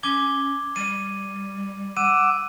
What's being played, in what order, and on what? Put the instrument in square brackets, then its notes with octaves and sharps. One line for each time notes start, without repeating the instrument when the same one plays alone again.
[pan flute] C#4 [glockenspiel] D6 G#6 G7
[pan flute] G3 [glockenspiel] D#7
[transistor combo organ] F#5 D6 E6 [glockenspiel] D#7